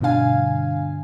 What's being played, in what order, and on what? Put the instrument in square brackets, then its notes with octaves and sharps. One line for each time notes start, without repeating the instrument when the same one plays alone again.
[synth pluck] G2 B2 D3 D4 F5 G#5